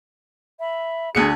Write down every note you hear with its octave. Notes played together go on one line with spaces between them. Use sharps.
E5 B5
D2 D3 G#4 C#7